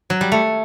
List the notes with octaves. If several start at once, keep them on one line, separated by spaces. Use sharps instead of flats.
F#3
G3
A3